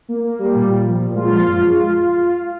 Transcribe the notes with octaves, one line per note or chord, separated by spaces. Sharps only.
A#3
A#3
G3
A#2
A#2
F3
A#2
G#3 F4
F3
F#2
G#3